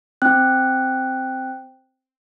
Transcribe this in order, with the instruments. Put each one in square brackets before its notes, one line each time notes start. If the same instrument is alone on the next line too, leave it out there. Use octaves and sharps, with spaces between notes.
[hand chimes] C4 G5 F#6